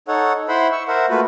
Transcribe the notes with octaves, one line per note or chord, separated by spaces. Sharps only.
D#4 A4 C#5 F#5
E4 C5 F#5 B5 C6
C#6 E6
A#4 C5 E5 F#5
A3 A#3 F4 F#4 B4